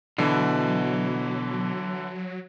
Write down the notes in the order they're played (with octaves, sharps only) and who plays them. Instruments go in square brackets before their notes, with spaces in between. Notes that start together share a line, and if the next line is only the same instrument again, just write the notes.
[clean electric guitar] B2 [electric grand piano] D3 E3 [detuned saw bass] F#3